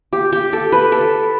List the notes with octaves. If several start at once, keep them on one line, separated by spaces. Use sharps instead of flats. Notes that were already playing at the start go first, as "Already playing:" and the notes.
G4
G4
A4
B4
A4